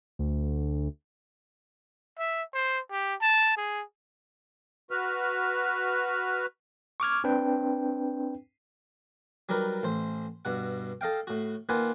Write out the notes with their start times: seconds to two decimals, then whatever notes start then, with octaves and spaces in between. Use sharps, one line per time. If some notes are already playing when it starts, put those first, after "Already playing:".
0.19 D2
2.19 E5
2.54 C5
2.91 G4
3.21 A5
3.57 G#4
4.91 F#4 B4 F6
7.00 C#6 D6 F6 G#6
7.24 C4 D4 B4 G5
9.49 F#3 G3 D#4 A#4 B4
9.83 A1 C5
10.45 G2 B2 F#5
11.01 A4 D#5 F5 G5
11.27 A2 F#4
11.69 D#3 A#3 F4 B4 F#5 G#5